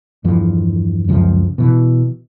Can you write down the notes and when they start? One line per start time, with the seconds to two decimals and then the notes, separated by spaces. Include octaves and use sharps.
0.24 E2 G2 E3 F3
1.09 C#2 F#2 F3
1.58 B2 E3